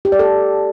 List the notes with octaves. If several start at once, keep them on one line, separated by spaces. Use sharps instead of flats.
G4
D5
A4